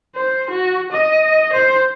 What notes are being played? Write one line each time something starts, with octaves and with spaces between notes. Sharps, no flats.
C5
F#4
D#5
C5